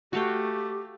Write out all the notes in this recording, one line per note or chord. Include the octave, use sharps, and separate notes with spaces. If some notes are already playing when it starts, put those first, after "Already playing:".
A3 F#4 G4 F5 G5